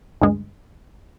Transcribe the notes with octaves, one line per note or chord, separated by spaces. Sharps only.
D2 G2 G#3